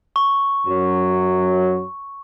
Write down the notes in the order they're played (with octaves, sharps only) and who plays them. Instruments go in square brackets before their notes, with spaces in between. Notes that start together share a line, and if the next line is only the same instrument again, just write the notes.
[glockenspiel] C#6
[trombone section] F#2 F#3